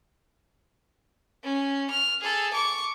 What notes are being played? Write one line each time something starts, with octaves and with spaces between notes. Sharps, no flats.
C#4
F6
G#4 A4
C#6 D6